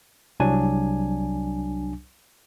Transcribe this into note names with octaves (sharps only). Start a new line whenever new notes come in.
C2 F#3 D4 G#5